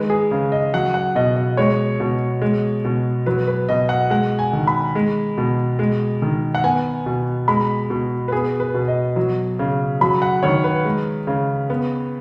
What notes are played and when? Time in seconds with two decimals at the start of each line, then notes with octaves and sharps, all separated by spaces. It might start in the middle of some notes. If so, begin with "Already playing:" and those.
Already playing: D#3 G#3 B4
0.10 G#4
0.31 C#3
0.52 D#5
0.74 F#3 F#5
0.94 F#5
1.15 B2 D#5
1.37 D#5
1.57 G#3 C#5
2.00 B2
2.42 G#3
2.84 B2
3.26 F#3 B4
3.47 B4
3.69 B2 D#5
3.89 F#5
4.10 G#3 F#5
4.39 G#5
4.53 D#3
4.67 B5
4.95 G#3
5.38 B2
5.79 G#3
6.22 D#3
6.55 F#5
6.64 B3 G#5
7.06 B2
7.48 G#3 B5
7.90 B2
8.28 B4
8.32 B3 G#4
8.60 B4
8.74 B2
8.88 D#5
9.16 F#3
9.59 C#3
10.01 F#3 B5
10.22 F#5
10.43 D#3 C#5
10.64 B4
10.85 G#3
11.27 C#3
11.70 B3